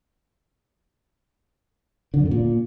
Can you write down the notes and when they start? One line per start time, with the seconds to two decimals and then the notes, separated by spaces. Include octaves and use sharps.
2.14 D3
2.20 F#2
2.25 D3
2.31 A#2